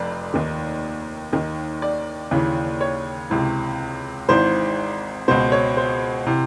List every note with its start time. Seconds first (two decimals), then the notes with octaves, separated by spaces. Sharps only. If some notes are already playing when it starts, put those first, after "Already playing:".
Already playing: F1 F2 C3 D5
0.34 D#2 D#3
1.33 D#2 D#3
1.82 D5
2.31 D#2 C#3 E3
2.81 C#5
3.30 C#2 C3 E3
4.29 G#1 G#2 E3 C5
5.28 C#2 B2 C5
5.52 C#5
5.77 C5
6.27 C3 E3